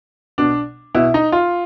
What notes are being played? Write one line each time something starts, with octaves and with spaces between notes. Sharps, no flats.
B2 D4
B2 E4
D#4
F4